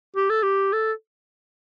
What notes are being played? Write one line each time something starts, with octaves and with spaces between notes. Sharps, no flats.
G4
A4
G4
A4